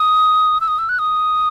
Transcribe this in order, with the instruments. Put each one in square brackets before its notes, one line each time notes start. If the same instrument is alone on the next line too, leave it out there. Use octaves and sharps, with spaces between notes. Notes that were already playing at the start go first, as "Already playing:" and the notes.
Already playing: [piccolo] D#6
E6
D#6
E6
F#6
D#6